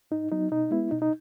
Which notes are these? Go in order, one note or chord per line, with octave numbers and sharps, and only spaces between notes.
G#2 D#4
F#3 B3 D#4
B2 D#4
G#3 B3 E4
B2 D#4
D#4